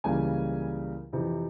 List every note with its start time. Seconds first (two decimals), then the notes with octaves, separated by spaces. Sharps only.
0.04 C#2 C#3 E3 G3 A#3 G#5
1.13 F2 C3 E3